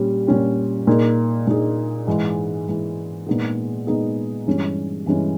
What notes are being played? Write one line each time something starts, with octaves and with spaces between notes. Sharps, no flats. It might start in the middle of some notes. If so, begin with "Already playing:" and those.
Already playing: A#2 G3 C#4
A#2 G3 C#4 G4
A#2 A#3 D#4 G#4
A#2 A#3 D#4 G#4
G#2 E3 G#3
G#2 E3 G#3
A#2 G#3 B3 D#4 G#4
A#2 G#3 B3 D#4 G#4
G2 E3 G#3 C#4
G2 E3 G#3 C#4